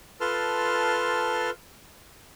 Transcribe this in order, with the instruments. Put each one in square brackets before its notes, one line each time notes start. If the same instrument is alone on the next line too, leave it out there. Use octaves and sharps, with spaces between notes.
[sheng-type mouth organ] F4 A4 B4 A5 C6 F6